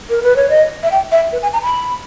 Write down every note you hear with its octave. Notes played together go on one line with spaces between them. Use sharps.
A#4
B4
C#5
D#5
E5
G5
E5
B4
G#5
A#5
B5